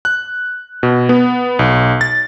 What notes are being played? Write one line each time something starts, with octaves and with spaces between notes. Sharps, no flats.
F#6
B2
B3
B1
A6